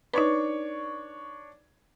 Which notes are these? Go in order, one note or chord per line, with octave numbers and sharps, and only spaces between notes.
D4 D#4 B4 C#5 C#6